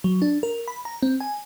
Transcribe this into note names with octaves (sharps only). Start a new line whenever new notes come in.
F#3
D4
A#4
B5
A#5
C4
G#5